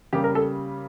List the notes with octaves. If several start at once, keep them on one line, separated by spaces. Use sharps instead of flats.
C#3 G3 A#3 G4
A#4
A4